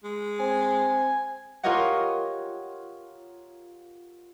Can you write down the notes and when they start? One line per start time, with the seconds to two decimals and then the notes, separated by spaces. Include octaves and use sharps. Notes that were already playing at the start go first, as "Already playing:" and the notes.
0.04 G#3
0.40 C4 G#5
1.63 F4 G4 A#4 C#5 D#5 F#5